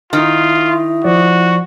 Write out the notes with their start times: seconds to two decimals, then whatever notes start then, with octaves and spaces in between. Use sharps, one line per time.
0.13 D#3 E4 F4
1.04 F3 F#4 D5